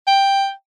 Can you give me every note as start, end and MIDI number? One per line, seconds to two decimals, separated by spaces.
0.07 0.51 79